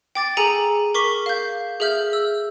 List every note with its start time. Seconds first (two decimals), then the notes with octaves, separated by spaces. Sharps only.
0.15 G5 D6 A6
0.37 G#4 A4 G#5 A#5 C#7 F#7
0.94 A#4 C#6 D6 B6
1.26 F5 G6
1.80 G#4 A4 E5 F6 G6
2.13 E6